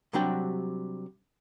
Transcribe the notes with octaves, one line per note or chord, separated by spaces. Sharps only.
C3 F#3 G3 D4 F#4 G5